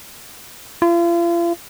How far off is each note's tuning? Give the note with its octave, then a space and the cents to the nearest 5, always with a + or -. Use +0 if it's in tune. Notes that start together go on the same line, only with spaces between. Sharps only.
F4 -40